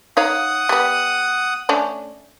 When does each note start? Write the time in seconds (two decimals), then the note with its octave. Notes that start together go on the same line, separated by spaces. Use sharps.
0.17 D#4 C#5 F5 F#5 D#6
0.69 G3 B3
1.69 A3 C#4 D4